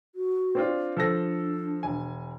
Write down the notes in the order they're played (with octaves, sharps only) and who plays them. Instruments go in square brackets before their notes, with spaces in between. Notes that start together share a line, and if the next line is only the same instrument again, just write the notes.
[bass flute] F#4
[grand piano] C4 D4 F4
[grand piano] F3 A4 A#6 [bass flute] D4
[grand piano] E1 G#5